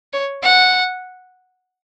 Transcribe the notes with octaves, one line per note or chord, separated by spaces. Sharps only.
C#5
F#5